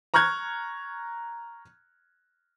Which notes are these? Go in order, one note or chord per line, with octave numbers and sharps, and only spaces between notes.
A#5 C#6 F6 F#6 G#6